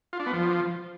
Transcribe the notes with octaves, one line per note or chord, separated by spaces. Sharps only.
F4
D4
B3
F3